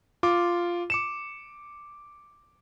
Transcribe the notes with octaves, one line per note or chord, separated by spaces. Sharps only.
F4 D6
D6 C#7 E7